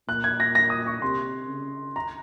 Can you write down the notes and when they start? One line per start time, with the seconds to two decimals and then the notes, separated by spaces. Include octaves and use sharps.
0.08 A#2 F#6
0.24 G#6
0.40 A#6
0.55 A#6
0.70 D#6
0.86 C#6
1.02 C3 C6
1.49 C#3
1.96 A#5